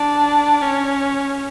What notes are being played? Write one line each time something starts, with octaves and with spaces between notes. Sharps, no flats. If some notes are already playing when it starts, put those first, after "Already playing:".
Already playing: D4
C#4